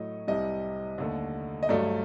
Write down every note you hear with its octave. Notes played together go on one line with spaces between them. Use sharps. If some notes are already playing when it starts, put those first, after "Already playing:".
Already playing: A2 F#3 A3 D#5
C2 C3 G3 D#5
D#2 D3 A3
D#5
G2 F#3 A3 D5